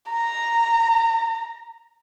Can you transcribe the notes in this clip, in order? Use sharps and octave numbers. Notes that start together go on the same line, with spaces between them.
A#5